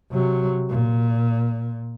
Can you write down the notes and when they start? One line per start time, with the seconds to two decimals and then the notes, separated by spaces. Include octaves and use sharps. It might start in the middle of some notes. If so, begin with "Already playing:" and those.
0.12 C3 F#3
0.70 A#2